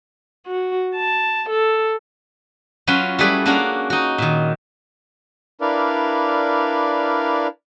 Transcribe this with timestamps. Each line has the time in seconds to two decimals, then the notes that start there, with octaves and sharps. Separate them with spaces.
0.47 F#4
0.96 A5
1.50 A4
2.87 F#3 C#4 F4 B4
3.19 G3 A3 E4 G#4 B4 D5
3.46 A#3 C#4 D4 F#4 F5
3.90 D#4 F#4
4.18 A#2 D#3
5.61 D4 E4 A#4 B4 D5 F5